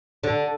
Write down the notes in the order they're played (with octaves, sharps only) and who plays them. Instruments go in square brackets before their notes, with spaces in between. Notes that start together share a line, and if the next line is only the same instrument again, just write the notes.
[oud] D3